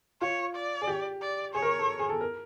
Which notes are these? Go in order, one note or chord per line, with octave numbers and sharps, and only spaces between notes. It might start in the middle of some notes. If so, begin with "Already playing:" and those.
F4 C#5
D5
G#4
G4
D5
G#4 C#5
A#4
A4
G#4
A4
A#4